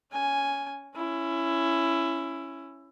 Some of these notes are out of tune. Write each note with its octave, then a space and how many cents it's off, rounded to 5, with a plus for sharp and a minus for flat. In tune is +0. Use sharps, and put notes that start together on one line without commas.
C#4 +15 G#5 +0
C#4 +0 E4 +15